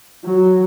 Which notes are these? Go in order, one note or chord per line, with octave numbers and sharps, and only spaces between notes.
F#3